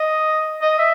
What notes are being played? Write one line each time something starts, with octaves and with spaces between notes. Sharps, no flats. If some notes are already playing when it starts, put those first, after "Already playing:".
Already playing: D#5
D#5
E5